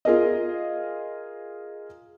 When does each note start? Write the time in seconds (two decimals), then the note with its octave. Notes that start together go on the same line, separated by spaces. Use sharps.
0.05 F4 G#4 A#4 D#5